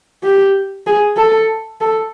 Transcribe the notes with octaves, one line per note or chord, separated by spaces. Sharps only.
G4
G#4
A4
A4